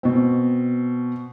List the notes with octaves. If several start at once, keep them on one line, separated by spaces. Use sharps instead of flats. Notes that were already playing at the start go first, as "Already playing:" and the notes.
B2 C4